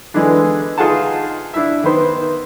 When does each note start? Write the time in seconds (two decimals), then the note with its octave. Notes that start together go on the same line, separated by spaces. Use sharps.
0.14 D3 E3 G#3 B3 D4
0.78 D#4 F4 G#4 B4 F#5 A5
1.54 D4 E4 E5
1.84 D#3 B3 C5